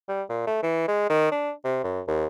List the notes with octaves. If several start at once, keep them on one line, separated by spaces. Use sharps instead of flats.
G3
A#2
A3
E3
G#3
D#3
D4
C3
F#2
D#2